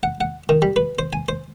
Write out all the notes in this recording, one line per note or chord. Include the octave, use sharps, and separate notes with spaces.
F#5
F#5
D#3
G3
B4
C5
G#5
C5